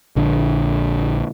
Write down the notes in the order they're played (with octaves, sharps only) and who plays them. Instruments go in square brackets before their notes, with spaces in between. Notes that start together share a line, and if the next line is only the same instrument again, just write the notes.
[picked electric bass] A#1 D3